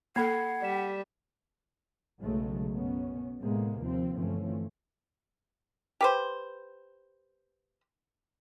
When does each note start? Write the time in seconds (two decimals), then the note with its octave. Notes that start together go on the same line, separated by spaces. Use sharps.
0.16 A#3 A4 F#5 B5 G#6 C7
0.62 G3 D5 B6 E7
2.21 B1 C#3 F#3 G#3 A3
2.74 F#2 B2 B3 C#4
3.40 A2 C3 G#3 A#3 B3
3.80 D#2 F3 C4
4.16 G1 E3 F3 A3 C4 C#4
6.01 G4 B4 C5